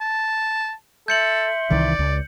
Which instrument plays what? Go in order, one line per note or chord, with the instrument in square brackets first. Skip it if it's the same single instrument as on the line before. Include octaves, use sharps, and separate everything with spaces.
[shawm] A5
[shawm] A4 [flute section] E5 C6 [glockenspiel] G6 C#7 F#7
[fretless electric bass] C2 D#3 E3 [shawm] D5
[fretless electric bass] C#2